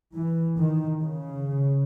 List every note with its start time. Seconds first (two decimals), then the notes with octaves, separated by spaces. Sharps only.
0.16 E3
0.58 D#3
1.00 C#3